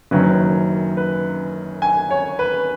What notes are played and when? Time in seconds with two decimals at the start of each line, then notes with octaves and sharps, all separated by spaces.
0.11 F#1 F#2 D#3 F#3 C#4 B4
0.97 B4
1.82 G#5
2.11 C#5
2.39 B4